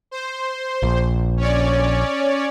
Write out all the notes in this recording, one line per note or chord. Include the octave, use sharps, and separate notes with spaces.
C5
A#1
C#4 C#5 D5